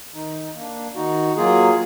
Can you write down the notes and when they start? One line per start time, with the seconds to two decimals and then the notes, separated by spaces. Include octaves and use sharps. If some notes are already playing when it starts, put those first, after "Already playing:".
0.13 D#3 D#4
0.55 A#3 D4
0.96 D#3 D#4 F#4
1.37 F#3 A#3 F4 G#4